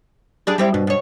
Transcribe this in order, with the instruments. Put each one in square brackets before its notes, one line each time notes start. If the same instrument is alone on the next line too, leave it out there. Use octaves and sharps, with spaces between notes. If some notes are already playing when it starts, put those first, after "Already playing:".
[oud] G3 D4 G#4
G3 C4 E4
[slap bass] G2 [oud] B2
[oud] B2 C#5